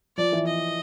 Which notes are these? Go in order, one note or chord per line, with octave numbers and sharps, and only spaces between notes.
F3 D5
E3
D#5